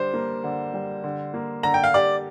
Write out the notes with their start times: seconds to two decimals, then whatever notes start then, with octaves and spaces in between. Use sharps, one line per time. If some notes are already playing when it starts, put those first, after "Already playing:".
Already playing: D3 G3 D4 C5
0.14 A#3
0.44 D3
0.74 G3
1.04 D3
1.34 A#3
1.63 D3 A#5
1.74 G5
1.84 F5
1.94 G4 D5